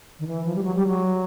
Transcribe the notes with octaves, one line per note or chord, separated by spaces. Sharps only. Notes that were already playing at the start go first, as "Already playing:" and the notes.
D#3
E3
F3
G3
F#3
G3
F#3